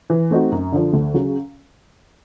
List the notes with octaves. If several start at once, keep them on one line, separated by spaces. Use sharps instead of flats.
E3
A3 C4 D#4 F#4
F#2
D3 F3
D2
C#3 F#3